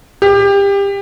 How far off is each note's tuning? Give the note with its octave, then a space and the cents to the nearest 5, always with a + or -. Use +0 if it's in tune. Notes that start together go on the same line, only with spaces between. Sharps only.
G4 +25